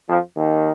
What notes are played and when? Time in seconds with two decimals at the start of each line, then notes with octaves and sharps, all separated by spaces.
0.09 F2 F3
0.37 D#2 D#3